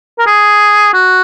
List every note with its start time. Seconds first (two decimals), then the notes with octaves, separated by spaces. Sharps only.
0.19 A#4
0.27 G#4
0.93 F#4